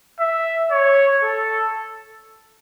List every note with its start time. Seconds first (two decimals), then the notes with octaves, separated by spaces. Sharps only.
0.20 E5
0.71 C#5
1.23 A4